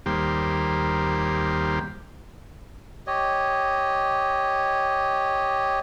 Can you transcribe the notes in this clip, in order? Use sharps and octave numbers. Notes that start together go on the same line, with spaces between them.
D#2 G3 A#3 G4 C5
G4 C#5 D#5